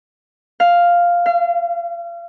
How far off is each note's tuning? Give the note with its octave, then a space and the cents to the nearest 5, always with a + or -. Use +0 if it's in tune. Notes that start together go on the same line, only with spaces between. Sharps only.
F5 +0
F5 -35